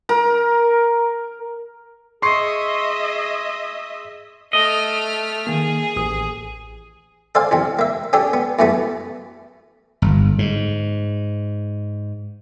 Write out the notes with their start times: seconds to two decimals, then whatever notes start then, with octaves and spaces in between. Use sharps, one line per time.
0.09 A#4
2.22 G#4 D#5 E5 C6 C#6 C7
4.53 A3 D#5 F6
5.47 D#3 A#3 G#4
5.96 A1 D#6
7.35 A4 C5 D5 F5 G#5
7.51 E2 C3 C4
7.79 A#3 E5
8.13 C#4 D4 G4 A4 D5
8.33 B3
8.59 F#2 A2 C3 A3 B3 A5
10.02 G1
10.39 G#2